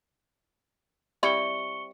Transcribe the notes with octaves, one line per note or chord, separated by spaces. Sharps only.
G3 C4 E4 C#6 C#7 G7